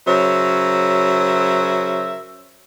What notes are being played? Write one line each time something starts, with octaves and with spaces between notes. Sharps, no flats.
C#3 F#3 A#4 C5 E5